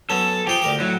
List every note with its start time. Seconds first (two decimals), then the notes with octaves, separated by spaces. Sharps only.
0.10 F#3 B3 C#4 A4
0.47 F3 G4 G#4 C6
0.62 D2 A#4 D6
0.80 A2 F#3